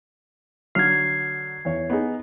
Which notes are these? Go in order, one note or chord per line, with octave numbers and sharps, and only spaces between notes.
D3 F#3 F6 G#6 C7
E2 C#5
B3 D#4 G#4